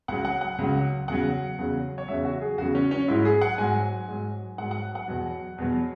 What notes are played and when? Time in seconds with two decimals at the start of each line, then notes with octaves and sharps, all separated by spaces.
0.08 C#2 C#3 F#3 F#5
0.25 F#5
0.41 F#5
0.58 C#2 C#3 F#3
1.08 E2 C#3 F#3 F#5
1.58 E2 C#3 F#3
1.98 C#5
2.08 E2 C#3 F#3 E5
2.25 F#4
2.41 G#4
2.58 E2 C#3 F#3 F#4
2.75 C#4
2.91 C#4
3.08 G#2 F#3 E4
3.25 G#4
3.41 F#5
3.58 G#2 F#3 G#5
4.08 G#2 F#3
4.58 G#2 F#5
4.63 F#3
4.71 F#5
4.95 F#5
5.08 E2 B2 F#3
5.58 E2 B2 F#3